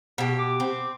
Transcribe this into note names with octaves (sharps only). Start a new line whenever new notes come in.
B2 G4
D6
C4